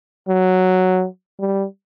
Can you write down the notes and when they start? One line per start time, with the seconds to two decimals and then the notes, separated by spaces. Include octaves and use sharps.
0.29 F#3
1.40 G3